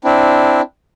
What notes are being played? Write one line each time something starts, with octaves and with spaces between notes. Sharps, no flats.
C4 D4 E4